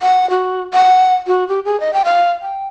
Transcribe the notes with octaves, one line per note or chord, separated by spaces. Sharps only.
F#5
F#4
F#5
F#4
G4
G#4
D#5
G5
F5
G5